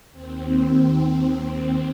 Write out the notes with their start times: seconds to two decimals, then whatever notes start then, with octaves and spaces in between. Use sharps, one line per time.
0.12 D#2 C4